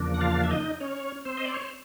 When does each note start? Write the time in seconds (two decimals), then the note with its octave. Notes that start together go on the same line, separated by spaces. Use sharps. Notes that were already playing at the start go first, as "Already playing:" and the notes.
Already playing: E2 C#3 F3 A#3 D4
0.14 F#5
0.21 F4 F5
0.44 E5
0.51 D#4 D#5
0.80 C#4 C#5
1.25 C4 C5
1.37 D#5
1.45 D5
1.54 C#5
1.62 C5